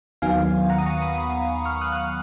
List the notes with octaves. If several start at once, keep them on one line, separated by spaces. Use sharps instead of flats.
D#2 D#3 F#3 B3 F5 G#5
F#5 A#5
D#6
A#5 C#6
B5 D#6
B5 D#6
C#6 F6
D#6 F#6
F#6
C#6 F6